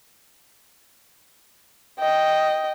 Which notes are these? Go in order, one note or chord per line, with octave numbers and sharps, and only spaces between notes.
D#5 G5